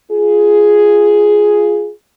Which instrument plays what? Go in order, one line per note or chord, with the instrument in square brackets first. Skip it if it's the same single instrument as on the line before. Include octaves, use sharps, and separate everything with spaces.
[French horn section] F4 G#4